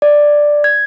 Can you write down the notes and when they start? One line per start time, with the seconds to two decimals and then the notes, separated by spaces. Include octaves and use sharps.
0.02 D5
0.64 G#6